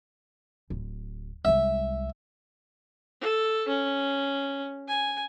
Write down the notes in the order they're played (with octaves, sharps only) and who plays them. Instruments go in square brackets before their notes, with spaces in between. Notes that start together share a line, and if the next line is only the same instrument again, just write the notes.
[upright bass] D1
[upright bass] C2 G#3 [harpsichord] E5
[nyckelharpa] A4
C#4
G#5